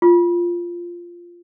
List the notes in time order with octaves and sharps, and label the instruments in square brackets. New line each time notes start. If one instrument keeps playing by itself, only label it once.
[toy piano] F4